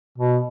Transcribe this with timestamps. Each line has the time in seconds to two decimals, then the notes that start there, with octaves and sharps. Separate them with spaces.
0.18 B2